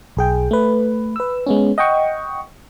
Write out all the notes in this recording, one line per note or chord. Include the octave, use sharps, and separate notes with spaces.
B1 G#4 G5
A3 B4
B4 E6
G#3 B3 C#4
D#5 F#5 G5 C#6